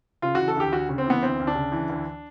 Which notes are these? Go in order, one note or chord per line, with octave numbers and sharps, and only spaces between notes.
C#3 F4
F#4
E3
A4
D2 G4
D2 F#4
C#3
C4
E3 B3
D2 C4
D2
D4
C#3
E3
D2